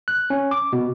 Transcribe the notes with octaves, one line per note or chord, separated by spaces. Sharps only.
F#6
C#4
D6
B2